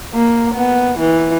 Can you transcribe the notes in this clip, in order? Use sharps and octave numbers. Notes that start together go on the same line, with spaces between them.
A#3
B3
E3